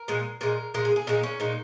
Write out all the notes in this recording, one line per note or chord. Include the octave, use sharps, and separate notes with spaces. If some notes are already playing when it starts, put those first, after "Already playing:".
Already playing: A#4
A#2 G#3
A#2 G#3 A#4
A#2 G#3 A#4
G#4
G#4
A#2 G#3 D#4
C#4
A#2 G#3 D#4